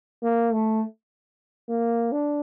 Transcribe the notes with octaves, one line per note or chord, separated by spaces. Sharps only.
A#3
A3
A#3
D4